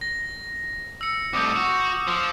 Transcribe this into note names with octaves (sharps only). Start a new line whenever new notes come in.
A#6
E6 C#7
C2 A2 D6 D#6 G6
F#4
F3